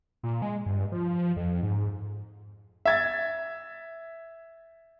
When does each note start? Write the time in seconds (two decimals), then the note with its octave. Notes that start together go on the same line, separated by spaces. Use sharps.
0.23 A#2
0.42 G#3
0.66 G2
0.92 F3
1.37 F2
1.63 G#2
2.85 E5 G#6 A6